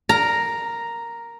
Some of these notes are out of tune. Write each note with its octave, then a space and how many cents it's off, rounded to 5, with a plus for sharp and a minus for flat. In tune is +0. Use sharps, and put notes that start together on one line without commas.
A#4 +0 A#5 +0